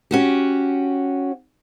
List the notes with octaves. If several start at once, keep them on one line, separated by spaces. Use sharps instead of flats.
C#4 F#4 G4